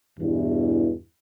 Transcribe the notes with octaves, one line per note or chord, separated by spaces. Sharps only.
E2 G2 B2 E3